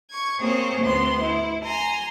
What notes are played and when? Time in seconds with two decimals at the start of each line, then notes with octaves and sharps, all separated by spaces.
0.10 C#6 G#6
0.40 A#3 C4 G#4 C5 C#5
0.81 D2 B3 C4 C6
1.21 E4
1.64 G#5 A#5 C6